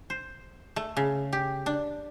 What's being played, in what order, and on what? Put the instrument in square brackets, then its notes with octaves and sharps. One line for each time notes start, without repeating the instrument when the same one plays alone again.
[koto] C5
A3
C#3
G4
D4